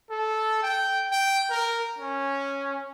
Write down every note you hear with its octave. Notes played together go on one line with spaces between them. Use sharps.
A4
G5
G5
A#4
C#4